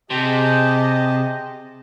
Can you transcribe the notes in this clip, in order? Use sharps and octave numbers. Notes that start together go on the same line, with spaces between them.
C3 G4 G#4 D#5 A5